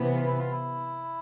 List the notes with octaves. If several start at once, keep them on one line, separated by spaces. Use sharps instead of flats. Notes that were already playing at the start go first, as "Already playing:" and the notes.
Already playing: C3 E3 B3
F4
E4
F4
E4